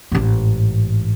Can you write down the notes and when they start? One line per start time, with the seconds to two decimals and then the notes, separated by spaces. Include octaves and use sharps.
0.12 A1 G#2